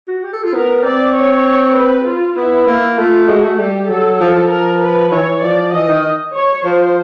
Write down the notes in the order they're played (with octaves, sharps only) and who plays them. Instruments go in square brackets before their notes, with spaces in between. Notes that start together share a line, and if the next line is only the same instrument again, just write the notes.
[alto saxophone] F#4
G4
A4
F4
[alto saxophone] B3 [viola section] A#4
[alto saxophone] C4 [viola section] D5
[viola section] C#5
B4
F4
[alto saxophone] B3 [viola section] E4
[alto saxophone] A#3
[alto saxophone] A3 [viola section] F4
[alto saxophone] G#3 [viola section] F#4
[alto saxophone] A3
[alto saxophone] G3 [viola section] G4
[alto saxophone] F#3 [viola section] A4
[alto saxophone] F3 [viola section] A4
[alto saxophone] F3
[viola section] A#4
B4
[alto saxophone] E3 [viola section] C#5
[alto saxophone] F3 [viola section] D5
[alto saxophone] E3 [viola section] D#5
[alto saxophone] D#3
[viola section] C#5
[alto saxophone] F3 [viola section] C5